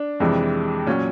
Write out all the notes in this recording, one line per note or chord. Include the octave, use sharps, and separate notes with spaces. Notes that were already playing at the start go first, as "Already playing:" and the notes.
Already playing: D4
F2 C3 E3 G#3
A#2 F#3 C#4